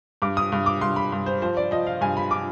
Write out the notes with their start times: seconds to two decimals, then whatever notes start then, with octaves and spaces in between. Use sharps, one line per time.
0.22 G2 D6
0.37 D#6
0.52 G2
0.66 D6
0.81 G2 C6
0.96 B5
1.12 G2
1.26 C5
1.42 F3 C5
1.57 D5
1.71 F3 D#5
1.86 F5
2.01 G2 G#5
2.17 B5
2.31 D6